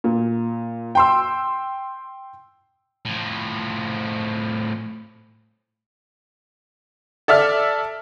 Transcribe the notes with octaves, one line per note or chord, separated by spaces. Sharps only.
A#2
G5 C6 E6
A2 F3
A4 D5 E5 F6